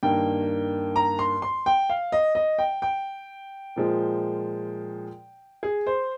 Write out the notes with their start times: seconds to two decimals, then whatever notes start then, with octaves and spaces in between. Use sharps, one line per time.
0.03 G2 D#3 A#3 G5
0.96 A#5
1.19 C6
1.42 C6
1.66 G5
1.90 F5
2.12 D#5
2.35 D#5
2.59 G5
2.82 G5
3.76 A#2 F3 G#3
5.63 G#4
5.87 C5